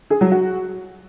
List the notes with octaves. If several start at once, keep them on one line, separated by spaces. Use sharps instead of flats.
G#4
F#3
F#4